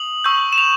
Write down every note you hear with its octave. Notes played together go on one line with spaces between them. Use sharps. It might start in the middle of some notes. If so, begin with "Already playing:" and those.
Already playing: D#6 F#7
C#6 E6 G6
E7
F7